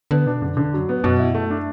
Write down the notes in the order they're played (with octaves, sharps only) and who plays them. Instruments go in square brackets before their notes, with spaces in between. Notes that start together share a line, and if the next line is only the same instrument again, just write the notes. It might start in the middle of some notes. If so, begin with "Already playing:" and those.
[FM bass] D3 [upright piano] B3
[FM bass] B2 [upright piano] D4
[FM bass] F#2 [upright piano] D3
[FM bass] E2 [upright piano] D3
[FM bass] F#2 [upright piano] F#3
[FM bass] A2 [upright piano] B3
[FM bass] F#2 [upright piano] B2
[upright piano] E4
A3
D4